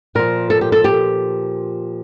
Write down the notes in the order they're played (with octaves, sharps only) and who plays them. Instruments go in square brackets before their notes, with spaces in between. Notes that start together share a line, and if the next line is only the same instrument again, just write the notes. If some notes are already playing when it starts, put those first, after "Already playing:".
[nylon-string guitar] A#2 F3 A#4
A4
G4
A4
G4